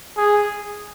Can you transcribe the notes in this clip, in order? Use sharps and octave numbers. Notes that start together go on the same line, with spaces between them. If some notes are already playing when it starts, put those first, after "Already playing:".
G#4